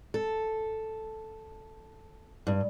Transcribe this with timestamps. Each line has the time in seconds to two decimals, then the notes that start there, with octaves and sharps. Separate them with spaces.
0.14 A4
2.47 G2